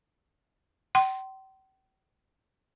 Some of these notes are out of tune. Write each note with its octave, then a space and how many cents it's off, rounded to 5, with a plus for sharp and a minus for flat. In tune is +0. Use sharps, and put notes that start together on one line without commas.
G5 -40 C6 +0